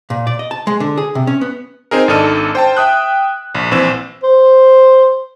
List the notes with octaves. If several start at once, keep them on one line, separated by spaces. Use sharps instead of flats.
A#2
D5
D#5
A5
G#3
D3
G#4
C3
C#4
B3
C4 D#4 G#4 A#4
G#1 D4 D#4 A4 F6 D#7
C5 G5 A5
E5 G5 D#6 F#6
A#1
A#1 E3 C4 E6 E7
C5